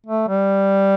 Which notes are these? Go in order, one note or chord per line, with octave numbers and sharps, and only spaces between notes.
A3
G3